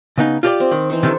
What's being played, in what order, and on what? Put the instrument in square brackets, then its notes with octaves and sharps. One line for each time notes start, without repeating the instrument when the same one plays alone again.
[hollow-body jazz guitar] C#3 B3 D#4
[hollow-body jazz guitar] F4 G4 D5 [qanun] D#5
[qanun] C4
[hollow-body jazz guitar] D#3
[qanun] E3 D#4 C5
[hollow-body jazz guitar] C3 D#3 E4 [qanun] D4 A4